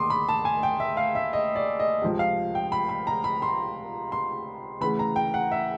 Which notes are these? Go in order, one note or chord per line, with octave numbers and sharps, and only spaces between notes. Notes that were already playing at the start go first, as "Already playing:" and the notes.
Already playing: D#2 D#3 C6 D6 D#6
B5
A5
G#5
G5
E5
F5
E5
D#5
D5
D#5
C#2 C3 F3
F5
G5
B5
B5
A#5
B5
C6
C6
D2 C#3 E3 B5
A#5
G5
F#5
E5